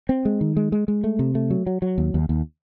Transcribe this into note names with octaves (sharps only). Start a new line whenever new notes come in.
C4
G#3
D#3
G#3
G#3
G#3
A3
C3
A3
F#3
F#3
F#3
D#2
D#2
D#2